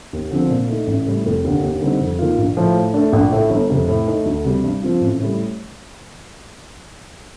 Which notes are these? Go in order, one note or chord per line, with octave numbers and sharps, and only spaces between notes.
D#2
D3 F3 C4
A#2
A3 D#4
A1
A2 G3
F1
D#2 D3
D#2
D3 G3 C4 D#4
F2
D#3 A#3 F4
A#1
A2 F3
A2
A3 D4
A#1
A2 A3
G1
F2 C3
A2
A3 D#4
D2
C3 G3
G2
F3 C4 F4
A1
A2 G3